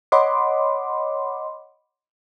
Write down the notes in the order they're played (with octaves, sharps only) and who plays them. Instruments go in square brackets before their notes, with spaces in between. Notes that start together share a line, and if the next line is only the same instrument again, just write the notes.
[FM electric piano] C#5 D#5 F#5 B5 C6 D6